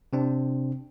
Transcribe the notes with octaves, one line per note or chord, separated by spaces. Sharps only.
C3 C4 D4